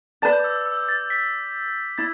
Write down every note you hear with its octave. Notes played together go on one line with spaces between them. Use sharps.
B4 D5 A5 A6
G6
D6
E6
E6
E6
E6
A6
B6
E4 A6